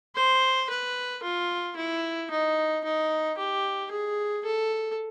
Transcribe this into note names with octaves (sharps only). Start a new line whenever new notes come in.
C5
B4
F4
E4
D#4
D#4
G4
G#4
A4